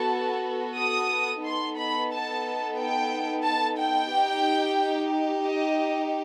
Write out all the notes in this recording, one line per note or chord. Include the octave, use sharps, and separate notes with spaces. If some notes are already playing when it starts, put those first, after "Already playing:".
Already playing: B3 F#4 A4 A5
D#6
B3 D#4 A4 C6
B5
A5
G5
A5
G5
D#4 G4
D#5